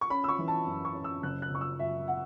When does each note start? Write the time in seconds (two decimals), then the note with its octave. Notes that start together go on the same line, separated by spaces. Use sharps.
0.01 C#6
0.10 C#4 B5
0.24 E6
0.29 C#6
0.38 E3
0.48 A5
0.67 F#2
0.85 C#6
0.94 C#4
1.04 E6
1.23 F#1 F#6
1.42 F#6
1.51 F#1 C#6
1.61 E6
1.79 F#2 E5
2.08 F#5